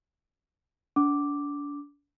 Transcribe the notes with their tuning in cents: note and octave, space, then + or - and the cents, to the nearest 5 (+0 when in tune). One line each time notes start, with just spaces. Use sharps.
D4 -35 D6 +0